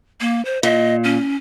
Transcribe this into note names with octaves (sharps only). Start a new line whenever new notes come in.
A#3
C5
A#2 D#5
C#4